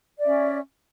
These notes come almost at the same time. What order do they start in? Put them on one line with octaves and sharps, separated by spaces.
D5 E5 C#4